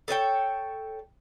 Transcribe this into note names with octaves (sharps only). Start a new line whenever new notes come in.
A4 C#5 D#5 G5